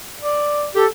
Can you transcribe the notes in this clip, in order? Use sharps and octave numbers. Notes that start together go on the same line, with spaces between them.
D5
G4 A4